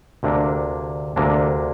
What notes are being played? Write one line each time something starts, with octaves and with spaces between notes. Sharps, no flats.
D2 C3 A#3 D4
D2 C3 A#3 D4